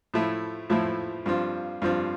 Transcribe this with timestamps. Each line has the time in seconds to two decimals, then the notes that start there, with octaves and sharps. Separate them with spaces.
0.14 A2 F3 A3 E4
0.70 A2 F3 A3 E4
1.26 G2 F3 C4 F4
1.82 G2 F3 C4 F4